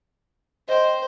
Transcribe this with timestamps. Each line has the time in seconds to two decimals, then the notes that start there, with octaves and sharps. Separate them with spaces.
0.69 C5 D#5 G5